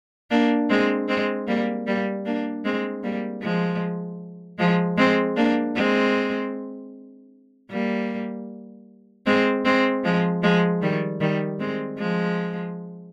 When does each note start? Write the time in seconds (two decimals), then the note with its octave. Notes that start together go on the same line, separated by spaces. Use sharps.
0.31 A#3 D4
0.69 G#3 C4
1.08 G#3 C4
1.48 G3 A#3
1.87 G3 A#3
2.25 A#3 D4
2.65 G#3 C4
3.03 G3 A#3
3.42 F3 G#3
4.58 F3 G#3
4.97 G#3 C4
5.36 A#3 D4
5.75 G#3 C4
7.71 G3 A#3
9.26 G#3 C4
9.65 G#3 C4
10.04 F3 G#3
10.43 F3 G#3
10.82 D#3 G3
11.21 D#3 G3
11.59 G#3 C4
11.99 F3 G#3